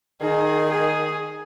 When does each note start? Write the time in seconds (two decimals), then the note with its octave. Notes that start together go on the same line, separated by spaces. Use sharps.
0.21 D#3 G#4
0.71 G#4